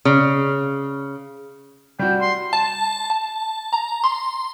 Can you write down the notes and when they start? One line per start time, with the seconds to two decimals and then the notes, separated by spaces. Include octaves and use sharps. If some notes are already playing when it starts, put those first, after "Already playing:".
0.05 C#3
1.99 G3 F#4 G5
2.21 C6
2.53 A5
3.10 A5
3.73 A#5
4.04 C6